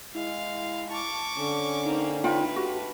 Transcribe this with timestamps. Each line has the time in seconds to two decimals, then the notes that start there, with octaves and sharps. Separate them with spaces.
0.15 G#3 E4 F5
0.90 A5 C#6 D6
1.37 D3 C#4
1.85 A#3 C4 D#4
2.24 A3 F4 B4 G5
2.56 F#4 G4